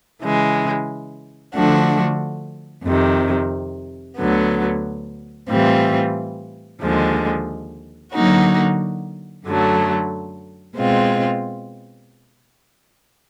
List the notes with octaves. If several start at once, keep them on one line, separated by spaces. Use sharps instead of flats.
C#3 E3 G#3
D3 F3 A3 D4 F#4
F2 C3 D#3
D2 D3 F#3 B3
A2 E3 G3 C4 F4
D#2 D3 F3 G#3
D3 F#3 A#3 D#4 F#4
F#2 D3 F#3 A3
B2 G#3 C4 F4